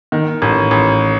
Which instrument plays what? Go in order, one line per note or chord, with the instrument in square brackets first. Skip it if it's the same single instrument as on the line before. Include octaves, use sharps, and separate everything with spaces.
[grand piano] D#3
A1
A1